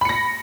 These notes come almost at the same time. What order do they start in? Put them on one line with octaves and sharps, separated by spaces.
B5 C#7 A#6